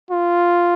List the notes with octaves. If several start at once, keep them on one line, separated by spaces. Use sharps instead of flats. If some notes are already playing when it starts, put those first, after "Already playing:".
F4